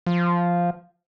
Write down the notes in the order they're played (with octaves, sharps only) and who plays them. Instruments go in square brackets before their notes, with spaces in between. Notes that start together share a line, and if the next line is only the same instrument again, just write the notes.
[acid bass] F3